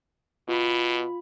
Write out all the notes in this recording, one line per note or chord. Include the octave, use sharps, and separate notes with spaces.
B2 F4 B5